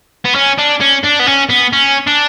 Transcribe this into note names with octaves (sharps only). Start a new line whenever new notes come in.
B3
C#4
D4
C#4
D4
B3
C#4
B3
C#4
D4